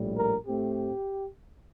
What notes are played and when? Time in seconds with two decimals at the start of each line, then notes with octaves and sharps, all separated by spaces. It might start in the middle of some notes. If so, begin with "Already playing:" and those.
Already playing: A#1 A2 G3
0.17 A#4
0.46 A2 A3 C4 G4